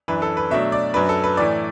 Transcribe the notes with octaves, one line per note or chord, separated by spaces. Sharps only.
F#2 E3 D4 B4
A4
B4
B2 F#3 A3 D4 E5
D5
F#2 F#3 D4 B4
A4
B4
A2 E3 A3 D5